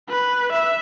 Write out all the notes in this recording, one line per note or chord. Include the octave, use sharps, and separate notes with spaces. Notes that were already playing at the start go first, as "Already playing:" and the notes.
B4
E5